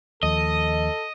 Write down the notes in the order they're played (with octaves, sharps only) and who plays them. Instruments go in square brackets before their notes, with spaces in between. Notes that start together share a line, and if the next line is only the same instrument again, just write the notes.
[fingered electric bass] D#2 F3 [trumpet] A4 [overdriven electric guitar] D#5